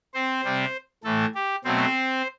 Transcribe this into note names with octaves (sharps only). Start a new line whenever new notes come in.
C4 C5
C3 G3 C4
A2 E3 A3 A4
G4
B2 F#3 A3 C4 C5